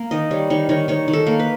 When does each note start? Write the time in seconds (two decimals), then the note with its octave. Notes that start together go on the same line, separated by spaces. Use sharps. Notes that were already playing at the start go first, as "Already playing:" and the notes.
Already playing: A#3
0.11 D#3 D#5
0.31 G3 C#5
0.50 D#3 C#5
0.69 D#3 C#5
0.88 D#3 C#5
1.08 D#3
1.13 A4
1.27 A#3
1.40 B4